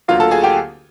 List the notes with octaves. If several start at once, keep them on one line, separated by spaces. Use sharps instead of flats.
D2 D3 F#3 A#3 F4 F5
A4 A5
G#4 G#5
G4 G5